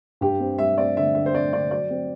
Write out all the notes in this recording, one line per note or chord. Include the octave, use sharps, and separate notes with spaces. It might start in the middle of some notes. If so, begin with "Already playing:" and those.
G2 G4
C4
G3 E5
C4 D5
D3 E5
D3 E5
C5
C4 D5
D3 D5
F#3 D5
C4